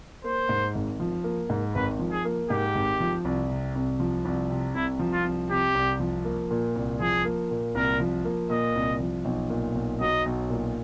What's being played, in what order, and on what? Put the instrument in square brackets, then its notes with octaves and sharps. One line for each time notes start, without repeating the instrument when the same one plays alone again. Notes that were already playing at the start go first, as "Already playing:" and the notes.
[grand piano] A#3 [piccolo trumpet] C5
[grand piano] G#2
G#1
F3
A#3
G#2
[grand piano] G#1 [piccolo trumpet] B4
[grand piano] F3
[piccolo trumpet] G#4
[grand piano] A#3
[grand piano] G#2 [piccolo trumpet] G4
[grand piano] G#1
F3
C2
C3
C2
F3
C2
C3
[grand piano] C2 [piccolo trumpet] E4
[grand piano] F3
[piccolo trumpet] F4
[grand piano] C2
[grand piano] C3 [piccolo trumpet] G4
[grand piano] C2
F3
A#3
A#2
C2
[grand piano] F3 [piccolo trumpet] G#4
[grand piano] A#3
A#2
[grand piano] C2 [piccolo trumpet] A#4
[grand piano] F3
A#3
[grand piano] A#2 [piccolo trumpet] D#5
[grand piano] C2
F3
B1
A#2
B1
[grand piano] F#3 [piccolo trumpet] D#5
[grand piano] B1
A#2